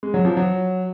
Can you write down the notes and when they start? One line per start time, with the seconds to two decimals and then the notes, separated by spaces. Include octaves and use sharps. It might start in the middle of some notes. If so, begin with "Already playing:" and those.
0.03 G#3
0.14 F#3
0.25 F3
0.37 F#3